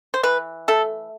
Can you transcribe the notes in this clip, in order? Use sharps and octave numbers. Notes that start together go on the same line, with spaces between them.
C5
E3 B4
A3 A4